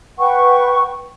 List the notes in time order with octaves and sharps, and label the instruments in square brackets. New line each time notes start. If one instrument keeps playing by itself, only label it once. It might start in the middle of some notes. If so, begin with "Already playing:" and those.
[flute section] B4 F#5 G5 C#6